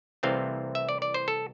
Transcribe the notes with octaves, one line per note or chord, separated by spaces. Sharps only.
C2 C3 E3 A3 C4 F5
E5
D5
D5
C5
A4